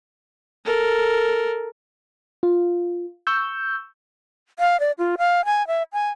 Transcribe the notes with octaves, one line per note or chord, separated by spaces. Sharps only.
A4 A#4
F4
C#6 E6 G6
F5
D5
F4
F5
G#5
E5
G#5